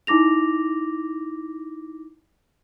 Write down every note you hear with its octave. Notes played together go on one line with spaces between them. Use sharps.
D#4 E4 D6 A#6 F7